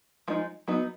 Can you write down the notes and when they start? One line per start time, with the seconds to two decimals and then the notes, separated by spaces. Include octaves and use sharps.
0.28 F3 G#3 D#4
0.68 F#3 B3 D#4